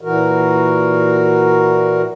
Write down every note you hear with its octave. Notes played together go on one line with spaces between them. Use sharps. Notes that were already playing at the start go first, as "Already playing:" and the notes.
A#2 E3 F#4 A#4